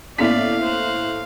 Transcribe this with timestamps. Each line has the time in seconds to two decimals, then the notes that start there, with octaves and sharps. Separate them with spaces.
0.18 A2 A#3 B3 C#4 D5 F5 B6
0.61 C5 F#6